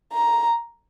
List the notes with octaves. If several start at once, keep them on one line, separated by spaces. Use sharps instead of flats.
A#5